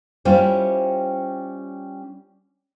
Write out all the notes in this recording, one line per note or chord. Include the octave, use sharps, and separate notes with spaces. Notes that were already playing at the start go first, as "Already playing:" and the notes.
G3 C#4 E4 F4 C5